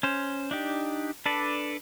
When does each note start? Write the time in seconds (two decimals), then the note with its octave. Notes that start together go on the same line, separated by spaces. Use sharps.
0.03 C#4 C5
0.51 D4 D#4 G4
1.26 D4 A4 B4 D5